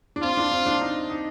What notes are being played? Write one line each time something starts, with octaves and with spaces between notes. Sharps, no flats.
D4
C4 F4
D4
C4
D4
D#4
D#4